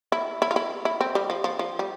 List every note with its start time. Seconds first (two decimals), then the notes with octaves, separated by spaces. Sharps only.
0.12 E4
0.42 E4
0.51 F4
0.56 E4
0.85 E4
1.01 C4
1.15 G3
1.30 F3
1.44 F3
1.59 F3
1.79 G3